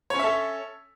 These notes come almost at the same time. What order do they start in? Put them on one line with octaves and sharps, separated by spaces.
C#5 C#4 E5 A4